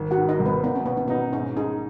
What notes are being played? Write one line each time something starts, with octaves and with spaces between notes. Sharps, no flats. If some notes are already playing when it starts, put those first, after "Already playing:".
Already playing: G#1
F#4 F#5
G#2
D#4 D#5
G#1
B3 B4
B3 D#4
C#4
B2 B3
C#4
B3 D#4
G#2 C#4
D#4 G#4